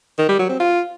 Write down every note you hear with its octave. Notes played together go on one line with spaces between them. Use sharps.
D#3
G3
F#3
C4
F4